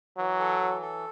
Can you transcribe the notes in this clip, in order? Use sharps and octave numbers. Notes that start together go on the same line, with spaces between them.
E3 F#3
A4
E3
A4